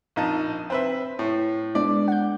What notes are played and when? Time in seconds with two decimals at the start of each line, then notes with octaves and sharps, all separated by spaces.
0.16 A#1 D#4 A5
0.70 C4 B4 E5
1.19 A2
1.75 G#3 B3 D4 D5
2.08 F#5 G6